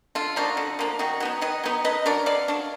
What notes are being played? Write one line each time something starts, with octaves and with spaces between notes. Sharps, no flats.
D3 F4
F3 A#3 D4 D#4 F#4
D3
F3 A#3 D4
D#3 D#4 F#4
F#3 B3 D#4
D#3 B4 D#5
F#3 B3 D#4
D3 B4 D#5
F#3 D4 A#4 D5
D3 D5 F5
F#3 D4